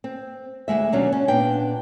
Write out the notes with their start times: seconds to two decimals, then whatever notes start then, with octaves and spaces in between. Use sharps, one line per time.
0.04 C4
0.68 D2 F3 G#3 E5
0.92 D#2 B2 F#3 C#4 D4
1.12 C#4
1.28 A#2 B3 D4 G5